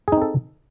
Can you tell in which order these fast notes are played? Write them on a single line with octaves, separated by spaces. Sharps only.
G#4 D#4 C4 A4